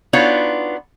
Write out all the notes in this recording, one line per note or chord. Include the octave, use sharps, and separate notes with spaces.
B3 D4 D#4 F4 F#4 C#5